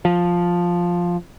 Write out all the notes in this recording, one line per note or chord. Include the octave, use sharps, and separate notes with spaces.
F3